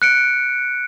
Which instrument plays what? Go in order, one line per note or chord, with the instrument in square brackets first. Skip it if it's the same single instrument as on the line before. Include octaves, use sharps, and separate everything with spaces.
[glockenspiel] F#6 C#7 D7